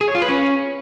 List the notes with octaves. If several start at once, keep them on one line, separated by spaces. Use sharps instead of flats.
G#4
C#5
F4
B4
C#4